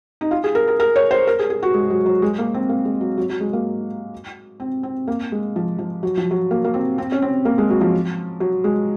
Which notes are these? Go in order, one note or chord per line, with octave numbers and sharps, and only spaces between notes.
D#4
F4
G#4
A#4
A#4
A#4
C#5
C5
A#4
G#4
G#4
F#4
G#3
F#3
F#3
G#3
A#3
C4
A#3
G#3
F#3
F#3
F#3
G#3
A#3
C4
C4
A#3
G#3
F3
F3
F#3
F3
F#3
A#3
A#3
C4
C4
C#4
C4
A#3
G#3
F#3
F3
F#3
G#3